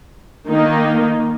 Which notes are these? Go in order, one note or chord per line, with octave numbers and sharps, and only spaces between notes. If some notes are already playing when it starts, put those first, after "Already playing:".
D#3 A#3 D#4